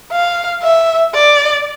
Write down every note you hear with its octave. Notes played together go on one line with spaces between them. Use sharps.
F5
E5
D5